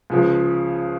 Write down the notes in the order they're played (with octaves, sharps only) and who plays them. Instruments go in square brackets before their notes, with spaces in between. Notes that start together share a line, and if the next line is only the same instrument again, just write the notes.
[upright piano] C#2 C#3 F3